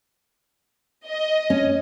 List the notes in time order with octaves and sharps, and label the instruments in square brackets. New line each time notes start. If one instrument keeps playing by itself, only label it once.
[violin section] D#5
[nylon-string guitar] C#4